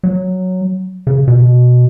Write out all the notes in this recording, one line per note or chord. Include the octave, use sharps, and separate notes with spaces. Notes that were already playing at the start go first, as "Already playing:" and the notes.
F#3
C#3
B2